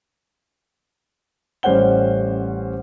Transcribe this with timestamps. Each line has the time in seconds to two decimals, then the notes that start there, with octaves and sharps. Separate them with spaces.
1.63 A1 G3 C#4 C5 F#5 G7